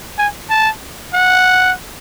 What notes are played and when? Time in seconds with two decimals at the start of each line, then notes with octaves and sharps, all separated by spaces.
0.18 G#5
0.50 A5
1.14 F#5